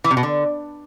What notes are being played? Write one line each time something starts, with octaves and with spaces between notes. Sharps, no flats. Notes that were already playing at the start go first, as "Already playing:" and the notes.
E3
C3
B2
D3